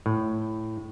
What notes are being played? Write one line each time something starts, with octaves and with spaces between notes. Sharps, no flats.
A2